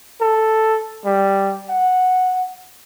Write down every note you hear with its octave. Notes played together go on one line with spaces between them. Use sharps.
A4
G3
F#5